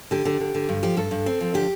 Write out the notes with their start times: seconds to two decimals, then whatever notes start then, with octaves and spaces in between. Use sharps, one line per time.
0.11 D3 G4
0.25 D3
0.40 D3
0.55 D3
0.69 G2
0.83 F3 G4
0.97 G2 A4
1.11 G2
1.26 C4
1.41 F3
1.54 D3 G4